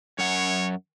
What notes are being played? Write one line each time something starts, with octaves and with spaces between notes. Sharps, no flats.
F#2 C#5 F#5